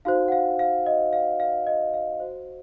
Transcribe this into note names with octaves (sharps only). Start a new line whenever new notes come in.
D#4 F#4 C5 F5
F#5
F5
F5
D#5
F5
F5
D#5
F5
F#4 C5